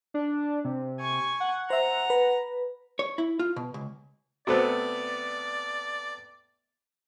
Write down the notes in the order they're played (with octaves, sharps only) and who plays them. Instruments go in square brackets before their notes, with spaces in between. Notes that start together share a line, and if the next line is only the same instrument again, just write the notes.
[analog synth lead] D4
C3
[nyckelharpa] G#5 C#6
[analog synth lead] F#5
[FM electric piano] C5 E5 [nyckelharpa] A#5
[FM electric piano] B4
[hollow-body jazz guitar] C#5
E4
F4
B2
C#2
[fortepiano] C3 A3 B3 [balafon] F#4 C5 [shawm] D5